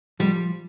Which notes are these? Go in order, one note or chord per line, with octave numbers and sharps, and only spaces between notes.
F3 G3 G#3